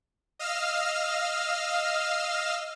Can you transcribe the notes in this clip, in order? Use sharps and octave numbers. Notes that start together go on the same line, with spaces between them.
D#5 F5 E6 F6